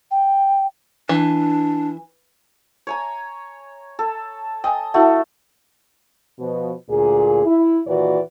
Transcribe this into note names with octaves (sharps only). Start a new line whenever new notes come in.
G5
E3 D4
C#5 G#5 A#5
A4
D#5 G5 G#5
A3 E4 F#4 F#5
B2 F3
D2 A#2 G#4
E4
D#2 A#2 E3 F#4 B4 D5